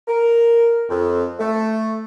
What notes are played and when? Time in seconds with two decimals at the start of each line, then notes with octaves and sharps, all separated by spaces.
0.08 A#4
0.89 F2
1.39 A3